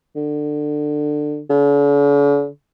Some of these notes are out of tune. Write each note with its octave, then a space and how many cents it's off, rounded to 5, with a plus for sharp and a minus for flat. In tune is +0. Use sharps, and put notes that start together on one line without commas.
D3 +20
D3 -45